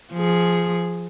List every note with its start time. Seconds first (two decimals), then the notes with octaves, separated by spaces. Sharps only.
0.13 F3 G#4